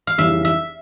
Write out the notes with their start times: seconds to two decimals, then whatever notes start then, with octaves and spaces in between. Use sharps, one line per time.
0.07 F5
0.18 F1 E2 C#3 E3 G3 E5
0.45 E5